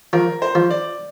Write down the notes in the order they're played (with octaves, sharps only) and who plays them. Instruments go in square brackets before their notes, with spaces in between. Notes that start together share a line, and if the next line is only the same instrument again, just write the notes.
[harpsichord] F3 [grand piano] A#4
[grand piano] C5
[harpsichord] F3
[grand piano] D5